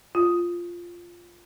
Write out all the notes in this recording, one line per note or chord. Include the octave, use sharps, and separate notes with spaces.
F4